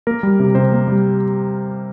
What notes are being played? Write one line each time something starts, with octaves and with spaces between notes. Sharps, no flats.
A#3 A#4
G3
C3
C3 C5
A#3
G3